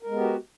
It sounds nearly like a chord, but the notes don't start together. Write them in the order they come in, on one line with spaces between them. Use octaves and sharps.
A#4 G#3 B3 G4 F#4